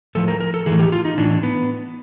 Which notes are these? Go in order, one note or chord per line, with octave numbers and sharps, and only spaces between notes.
A2 F3 A4
A#4
A#4
A4
A2 E3 G#4
G4
F4
D#4
A2 E3 D4
B3